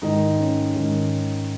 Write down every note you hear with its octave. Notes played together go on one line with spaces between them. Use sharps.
G#2 D#3 D#4
C#4
G#2 D#3